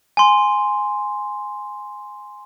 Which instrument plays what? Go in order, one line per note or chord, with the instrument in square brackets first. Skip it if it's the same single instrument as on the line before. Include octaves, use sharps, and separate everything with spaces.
[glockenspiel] G#5 C6